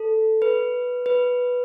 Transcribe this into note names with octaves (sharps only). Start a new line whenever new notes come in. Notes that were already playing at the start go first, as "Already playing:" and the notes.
Already playing: A4
B4
B4